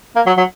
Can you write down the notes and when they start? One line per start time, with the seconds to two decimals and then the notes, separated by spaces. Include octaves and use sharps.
0.16 A#3
0.26 F#3
0.37 F#3